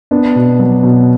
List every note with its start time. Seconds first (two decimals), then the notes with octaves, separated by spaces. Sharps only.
0.11 B3 D4
0.35 B2
0.59 F#3
0.83 B2